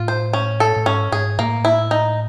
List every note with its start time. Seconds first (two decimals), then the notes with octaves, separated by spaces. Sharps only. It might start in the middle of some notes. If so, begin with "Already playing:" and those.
Already playing: A2 F4
0.08 C5
0.33 C#4
0.60 A4
0.76 A2
0.86 G#2 C#4
1.12 G#2 G#4
1.39 A2 A#3
1.65 E4
1.91 D#4